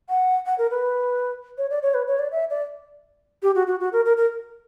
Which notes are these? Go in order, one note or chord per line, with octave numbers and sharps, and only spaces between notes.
F#5
F#5
A#4
B4
C#5
D5
C#5
B4
C#5
D5
E5
D5
G4
F#4
F#4
F#4
A#4
A#4
A#4